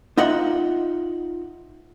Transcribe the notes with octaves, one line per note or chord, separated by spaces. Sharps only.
D#4 F4 D#5 E5 F#5